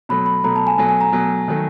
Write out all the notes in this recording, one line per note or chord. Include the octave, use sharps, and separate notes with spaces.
B2 F#3 A3 B5
B5
B2 F#3 A3 A#5
A5
G#5
B2 F#3 A3 G#5
G#5
A#5
B2 F#3 A3
D#3 F#3 A3